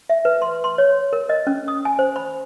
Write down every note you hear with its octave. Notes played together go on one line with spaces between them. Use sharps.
E5
B4
C6
C6
C#5
A#4
D#5
C#4
D#6
G#5
C5
B5